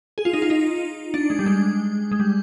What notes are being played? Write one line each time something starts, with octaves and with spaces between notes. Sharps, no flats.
G#4
F4
D#4
F4
D#4
D4
G#3
G3
G#3
G#3
G3